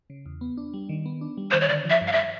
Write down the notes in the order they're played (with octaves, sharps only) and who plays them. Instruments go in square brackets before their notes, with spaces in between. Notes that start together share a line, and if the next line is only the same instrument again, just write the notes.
[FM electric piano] C#3
E2
B3
D4
G3
D#3
B3
D4
G3
[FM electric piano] D#3 [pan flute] C5
[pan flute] C#5
[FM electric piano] D3 [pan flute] D5
[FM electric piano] F3
[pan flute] E5
[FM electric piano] G2
[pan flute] F5
E5